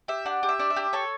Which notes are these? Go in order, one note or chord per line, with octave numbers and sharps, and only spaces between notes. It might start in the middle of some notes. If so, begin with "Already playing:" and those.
G4 E5
D4 F#5
G4
E5
D4
E5
G4
A4 C#5